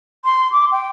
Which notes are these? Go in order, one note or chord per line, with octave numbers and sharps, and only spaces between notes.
C6
D6
G5